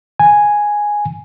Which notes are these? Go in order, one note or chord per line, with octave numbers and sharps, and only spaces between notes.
G#5